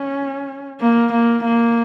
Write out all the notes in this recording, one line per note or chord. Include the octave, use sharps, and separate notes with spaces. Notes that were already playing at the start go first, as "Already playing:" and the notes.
Already playing: C#4
A#3
A#3
A#3